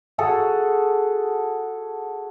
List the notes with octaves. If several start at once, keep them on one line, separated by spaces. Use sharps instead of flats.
F#4 G#4 A4 F#5